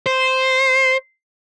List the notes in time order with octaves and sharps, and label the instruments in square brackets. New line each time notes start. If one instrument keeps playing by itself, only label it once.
[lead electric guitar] C5